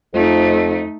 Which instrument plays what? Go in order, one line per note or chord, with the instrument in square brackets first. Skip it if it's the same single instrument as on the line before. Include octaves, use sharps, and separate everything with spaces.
[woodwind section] F2 [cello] A3 D#4